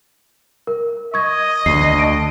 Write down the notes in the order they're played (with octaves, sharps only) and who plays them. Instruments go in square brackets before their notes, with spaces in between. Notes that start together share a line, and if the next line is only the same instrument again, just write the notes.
[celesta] A#4
[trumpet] D#5 [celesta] C#6 G#6
[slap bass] D2 [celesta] C7
[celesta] A5 D7